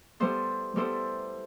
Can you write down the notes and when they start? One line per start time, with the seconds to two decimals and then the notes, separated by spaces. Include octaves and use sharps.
0.20 G3 B3 E4 A4 C5
0.76 G3 B3 E4 A4 C5